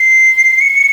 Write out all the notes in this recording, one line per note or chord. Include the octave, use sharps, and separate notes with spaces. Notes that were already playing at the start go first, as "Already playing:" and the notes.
Already playing: C7
C#7